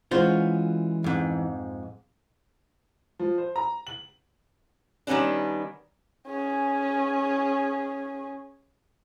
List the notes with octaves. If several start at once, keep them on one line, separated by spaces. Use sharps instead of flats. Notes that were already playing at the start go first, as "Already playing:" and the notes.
E3 G#3 C#4 F4 F#4 C5
F2 G#2
F3
C5
A#5
F#7
D#3 G3 B3 C#4 D4
C#4 G#4